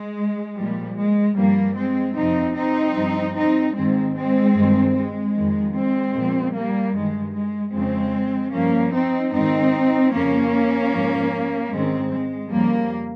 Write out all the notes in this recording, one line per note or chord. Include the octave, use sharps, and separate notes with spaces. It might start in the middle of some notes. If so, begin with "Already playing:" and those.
Already playing: G#3
A#2 F3 G3
G#3
G2 F3 G3 A#3
G#3 C4
F2 C3 F3 C4 D#4
C4 D#4
G2 F3
C4 D#4
G#2 D#3 G#3 C4
G#3 C4
G2 D#3
G#3
F2 D#3
G#3 C4
A#2 F3
G3 A#3
G2 D#3 G#3
G#3
F2 C#3 F3 G#3 C4
G2 F3 A#3 C#4
C4 D#4
G#2 D#3 C4 D#4
F2 C#3 F3 A#3 C#4
G#2 F3
G#2 D#3 G#3 C4
G#3
F2 C#3 F3 G3 A#3